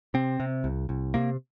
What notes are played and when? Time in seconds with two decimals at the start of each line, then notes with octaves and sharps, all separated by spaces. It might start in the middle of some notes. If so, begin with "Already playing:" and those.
0.14 C3 C4
0.40 C3
0.64 C2
0.89 C2
1.14 C3 A#3